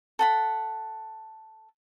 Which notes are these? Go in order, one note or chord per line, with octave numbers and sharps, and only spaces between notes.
A4 F#5 B5